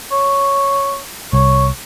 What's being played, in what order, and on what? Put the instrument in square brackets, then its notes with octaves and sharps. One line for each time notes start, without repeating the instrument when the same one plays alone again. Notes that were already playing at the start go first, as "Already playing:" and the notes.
[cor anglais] C#5
[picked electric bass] C2 [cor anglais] C#5